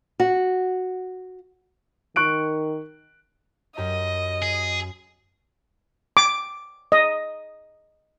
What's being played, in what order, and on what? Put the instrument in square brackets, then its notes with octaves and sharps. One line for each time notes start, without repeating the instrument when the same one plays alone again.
[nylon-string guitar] F#4
[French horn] D#3 [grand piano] C#6 F#6 D7
[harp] F#2 G4 A#5 [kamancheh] D#5
[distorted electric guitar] G#4
[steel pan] D6
D#5